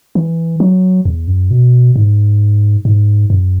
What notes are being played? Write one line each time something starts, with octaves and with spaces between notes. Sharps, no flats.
E3
F#3
E2
F#2
B2
G#2
G#2
F#2